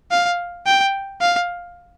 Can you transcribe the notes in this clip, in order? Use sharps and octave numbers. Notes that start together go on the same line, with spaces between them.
F5
G5
F5